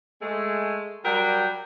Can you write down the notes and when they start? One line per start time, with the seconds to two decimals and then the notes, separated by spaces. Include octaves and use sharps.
0.21 G#3 A3
1.04 F#3 G3 A#4 G5